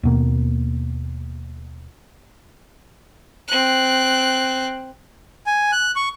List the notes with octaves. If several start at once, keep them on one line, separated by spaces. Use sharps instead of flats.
D#2 B2 A#3
C4 F#6
G#5
F#6
C#6